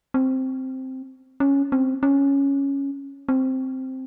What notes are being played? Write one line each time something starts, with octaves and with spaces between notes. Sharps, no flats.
C4
C#4
C4
C#4
C4